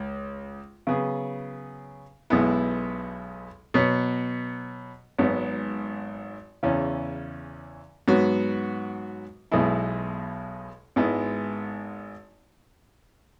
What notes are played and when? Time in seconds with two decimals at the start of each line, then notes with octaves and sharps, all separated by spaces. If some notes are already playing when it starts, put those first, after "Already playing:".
Already playing: C#2
0.87 C#3 F#3 B3 G#4
2.30 B1 B2 G#3 B3 E4
3.74 B2 F#3 B3
5.18 G#1 G#2 F#3 B3
6.63 E2 C#3 E3 C#4
8.08 G#2 F#3 B3 F#4
9.51 B1 B2 G#3 E4
10.96 G#1 G#2 G#3 B3 E4